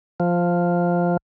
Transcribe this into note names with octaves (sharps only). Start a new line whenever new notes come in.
F3